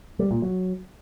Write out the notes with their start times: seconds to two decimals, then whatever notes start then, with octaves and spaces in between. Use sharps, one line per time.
0.19 G3
0.31 A#2
0.42 F#3